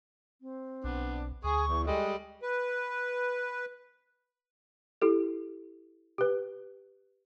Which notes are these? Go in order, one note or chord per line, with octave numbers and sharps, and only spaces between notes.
C4
B1 B3 D4
D2 G#4 C#6
E2
G3 G#3 A4
B4
E4 G4 A4
G4 B4